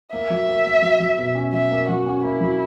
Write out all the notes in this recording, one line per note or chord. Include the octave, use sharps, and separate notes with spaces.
A#3 E5
F#3
A#3
A#3
F#3
F#3
B2
C#4
F#3 E5
A#3
F#3 F#4
C#4
A#3 E4
F#3